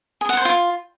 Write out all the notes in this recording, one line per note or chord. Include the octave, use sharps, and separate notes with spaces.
G#4
F#5
C5
F4